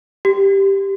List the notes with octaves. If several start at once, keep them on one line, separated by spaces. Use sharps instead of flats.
G4